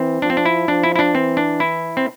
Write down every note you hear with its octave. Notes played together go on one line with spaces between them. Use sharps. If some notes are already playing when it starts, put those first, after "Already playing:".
Already playing: E3 C4
F3 D4
C4
D4
E4
F3 D4
E4
E4
D4
E3 C4
D4
E4
C4